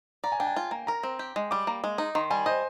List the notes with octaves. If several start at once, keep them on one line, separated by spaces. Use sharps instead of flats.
D5 A#5
G#5
D4 G5
G#5
F4
A#3
A#4 A#5
C4
G4
G#3
G3 D6
A#3
G#3
D#4
D#3 C6
G3 G#5
C5 D#5